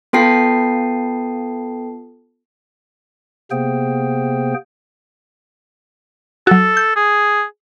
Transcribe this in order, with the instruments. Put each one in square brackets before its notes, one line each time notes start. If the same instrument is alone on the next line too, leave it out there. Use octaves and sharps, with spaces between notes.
[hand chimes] B3 F4 A4 G5 A5 C7
[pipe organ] C3 A#3 B3 G#4 C5 G5
[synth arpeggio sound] F#3 F#4 [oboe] A4
[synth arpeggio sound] G6
[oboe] G#4